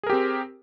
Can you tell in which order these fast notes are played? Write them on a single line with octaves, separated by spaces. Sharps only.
G#4 A#4 G4 C4